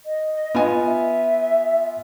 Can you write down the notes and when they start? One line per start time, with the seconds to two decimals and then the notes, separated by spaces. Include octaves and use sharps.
0.05 D#5
0.55 B3 F4 G#5
0.86 E5